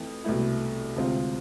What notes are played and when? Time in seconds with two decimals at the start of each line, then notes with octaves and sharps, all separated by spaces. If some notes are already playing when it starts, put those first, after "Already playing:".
Already playing: F2 E3 A3
0.25 C2 B2 A3 E4
0.96 D2 C3 G#3 C4 F4